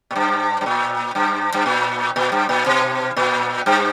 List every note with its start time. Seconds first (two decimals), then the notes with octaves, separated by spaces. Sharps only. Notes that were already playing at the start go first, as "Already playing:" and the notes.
0.11 A#2
0.16 G2
0.61 G2
0.66 A#2
1.15 G2
1.54 G2
1.66 A#2
2.16 A#2
2.32 G2
2.49 A#2
2.66 B2
3.16 A#2
3.66 G2